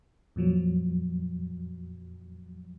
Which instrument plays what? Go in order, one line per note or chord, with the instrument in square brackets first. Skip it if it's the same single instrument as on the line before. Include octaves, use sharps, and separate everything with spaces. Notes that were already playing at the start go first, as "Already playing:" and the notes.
[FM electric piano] F2 A#2 F3 F#3